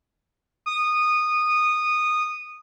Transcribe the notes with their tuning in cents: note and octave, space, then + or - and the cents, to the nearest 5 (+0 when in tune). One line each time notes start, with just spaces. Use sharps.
D#6 -15